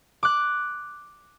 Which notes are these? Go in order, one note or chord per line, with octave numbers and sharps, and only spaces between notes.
D6 F#6